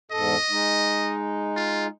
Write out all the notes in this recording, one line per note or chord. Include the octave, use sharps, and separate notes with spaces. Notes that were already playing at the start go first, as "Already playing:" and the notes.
E2 G#2 A4 D#5
G#3 D#4
F4